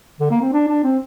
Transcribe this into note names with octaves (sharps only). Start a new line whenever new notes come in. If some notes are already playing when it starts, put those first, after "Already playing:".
D3
A#3
C4
D4
D4
C4